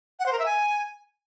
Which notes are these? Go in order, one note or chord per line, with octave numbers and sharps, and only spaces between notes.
F#5
C5
A#4
E5
G#5